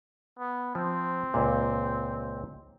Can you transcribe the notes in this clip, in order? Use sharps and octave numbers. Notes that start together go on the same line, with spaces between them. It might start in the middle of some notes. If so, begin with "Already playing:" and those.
B3
F3 C4
C#2 A#2